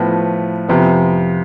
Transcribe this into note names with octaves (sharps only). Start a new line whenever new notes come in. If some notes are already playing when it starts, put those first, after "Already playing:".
Already playing: A2 F3 B3
F2 C3 F3 B3